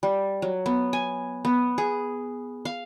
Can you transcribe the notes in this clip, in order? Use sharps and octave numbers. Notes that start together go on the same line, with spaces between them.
G3
F#3
B3
G#5
B3
G#4
F5